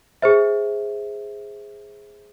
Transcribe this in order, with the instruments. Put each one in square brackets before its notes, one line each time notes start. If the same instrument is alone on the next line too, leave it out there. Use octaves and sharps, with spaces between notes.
[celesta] G#4 C5 E5